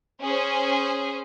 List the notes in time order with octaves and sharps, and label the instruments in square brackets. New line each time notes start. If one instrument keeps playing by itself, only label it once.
[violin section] C#4 G#4 C5